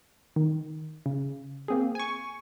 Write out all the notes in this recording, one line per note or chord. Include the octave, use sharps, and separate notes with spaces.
D#3
C#3
A#3 C4 G#4
G#5 C#6